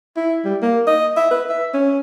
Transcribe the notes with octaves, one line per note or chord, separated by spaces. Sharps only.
E4
G3
A#3
D#5
E5
B4
E5
C#4